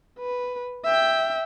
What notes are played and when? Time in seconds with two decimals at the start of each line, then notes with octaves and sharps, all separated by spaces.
0.19 B4
0.85 E5 G5